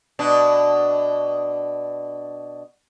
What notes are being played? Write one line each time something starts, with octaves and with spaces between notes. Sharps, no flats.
B2 D4